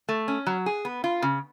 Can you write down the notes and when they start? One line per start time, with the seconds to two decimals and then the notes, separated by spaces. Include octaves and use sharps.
0.09 A3
0.28 C#4
0.47 F#3
0.66 G#4
0.85 B3
1.04 F4
1.22 C#3